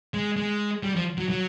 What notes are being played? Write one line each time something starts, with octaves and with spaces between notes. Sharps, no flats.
G#3
G#3
G3
F3
F#3
F#3